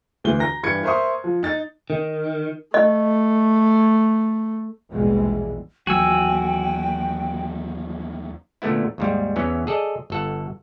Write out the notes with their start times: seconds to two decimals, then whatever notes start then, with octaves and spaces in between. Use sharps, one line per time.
0.24 D2 E3 G7
0.40 A#5 A#6
0.63 G2 E3 B5 G#6 C#7
0.83 A#4 C5 E5 C6 C#6 D#6
1.24 F3
1.43 D#4 A6
1.90 D#3
2.74 A3 D#5
4.90 A#1 D#2 B2 E3 G3 G#3
5.87 D#2 E3 F#3 F#4 G5 G#5 E6
8.62 A#2 D3 A3 B3 E4
8.98 D#2 G#2 G3
9.36 E2 E3 B3 C#4
9.67 G#4 A4 D5 D#5
10.10 G1 A4 F#5